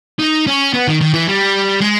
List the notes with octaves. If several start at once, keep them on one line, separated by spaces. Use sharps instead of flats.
D#4
C#4
B3
D#3
D#3
E3
G3
G#3